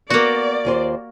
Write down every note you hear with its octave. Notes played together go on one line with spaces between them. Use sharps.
A#3 B3 F#4 D5
D#2 F4 C5